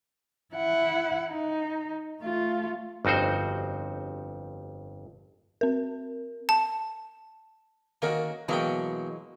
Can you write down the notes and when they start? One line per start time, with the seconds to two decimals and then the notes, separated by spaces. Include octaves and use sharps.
0.54 E4 F#5
1.31 D#4
2.23 A3 F4
3.05 G1 F2 D#4 F#4 C5
5.61 C4 A#4
6.49 A5
8.02 D#3 A#3 C#4 F#4 A#4
8.48 B2 E3 F#3 G#3 A#3 G5